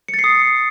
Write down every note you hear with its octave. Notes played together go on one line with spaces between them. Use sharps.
C#7
A6
C7
D#6